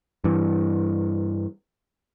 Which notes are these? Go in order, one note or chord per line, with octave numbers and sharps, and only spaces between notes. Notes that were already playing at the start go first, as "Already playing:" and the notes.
G2 E3